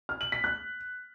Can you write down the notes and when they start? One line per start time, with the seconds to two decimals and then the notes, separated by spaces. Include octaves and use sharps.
0.09 F6
0.21 F#7
0.32 B6
0.44 F#6